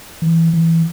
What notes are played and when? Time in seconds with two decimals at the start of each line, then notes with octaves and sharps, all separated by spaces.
0.22 E3
0.53 E3